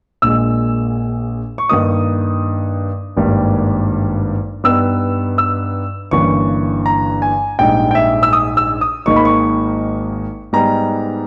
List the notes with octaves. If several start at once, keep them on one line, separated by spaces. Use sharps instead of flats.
A#1 A#2 G#3 E6
C#6
G2 D#3 A#3 D#4 D#6
G#1 G2 G3 A#3
G2 G3 B3 D#4 E6
E6
G1 G2 E3 A#3 C#4 C#6
A#5
G#5
A#1 G#2 G3 G5
G5
E5
E6
D#6
E6
D#6
G#1 G#2 D#3 A#3 D#4 C#6
B5
C#6
G#2 G3 B3 D#4 A#5